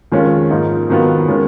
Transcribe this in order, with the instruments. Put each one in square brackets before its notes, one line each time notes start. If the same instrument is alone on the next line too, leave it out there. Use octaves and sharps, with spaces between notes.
[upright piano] F2 D#3 G#3 C#4 F4
G#2 F3 A#3 D#4
F2 D#3 F#3 B3 F4
D#3 G#3 C#4